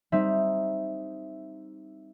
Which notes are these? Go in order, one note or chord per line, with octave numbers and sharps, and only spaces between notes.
G3 C4 D#4 E5